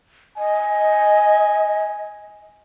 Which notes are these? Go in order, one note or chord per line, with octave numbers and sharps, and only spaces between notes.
D#5 G#5